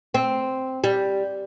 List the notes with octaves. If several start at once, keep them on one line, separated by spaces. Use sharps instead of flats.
C4
G3